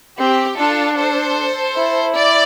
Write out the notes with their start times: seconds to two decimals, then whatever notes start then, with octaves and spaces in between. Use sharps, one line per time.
0.18 C4 G4
0.58 D4 F4 A4
0.97 A4 C5
1.76 E4
2.15 D5